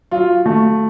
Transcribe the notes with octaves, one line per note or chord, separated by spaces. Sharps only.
F#3 F4
A3